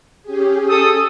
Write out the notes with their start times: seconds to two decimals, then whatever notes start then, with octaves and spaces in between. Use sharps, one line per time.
0.23 C#4 G4 G#4
0.69 A4 D#6